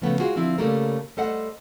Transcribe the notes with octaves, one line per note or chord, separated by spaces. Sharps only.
C#3 F3 A3 B3
G#3 F4 F#4 G#4 C5
D3 F3 C4 E4
C#3 G3 A3 A#3 A4 A#4
G3 A3 A4 C5 D#5 F#5